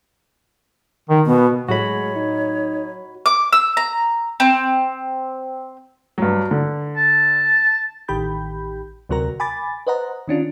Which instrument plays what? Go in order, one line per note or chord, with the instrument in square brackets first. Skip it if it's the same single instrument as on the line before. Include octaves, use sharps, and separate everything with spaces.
[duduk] D#3
[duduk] B2 [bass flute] B3
[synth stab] A2 F#3 [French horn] G#3 [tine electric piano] F#4 B5 [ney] C#5
[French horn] D#4
[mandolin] D6
E6
A#5
C4
[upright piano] G2 F#3
D3
[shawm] A5
[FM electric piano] A1 D#3 G4 B5 G6
D2 C3 F#3 F#4 A#4 A#5
G#5 B5 D6 A6
B4 C5 D#5 F#5 A#5
D#3 C#4 D4 F4